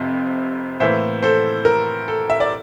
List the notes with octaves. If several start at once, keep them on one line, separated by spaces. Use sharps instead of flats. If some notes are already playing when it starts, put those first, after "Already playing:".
Already playing: F1 F2 C3 F3
A2 E3 A#3 C5 E5
A4 C5
A#4
A4
E5
D5